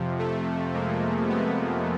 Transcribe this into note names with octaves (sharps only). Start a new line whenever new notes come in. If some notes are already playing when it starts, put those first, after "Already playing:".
Already playing: F2 C3 F3
A3
G#3 A#3
A3 B3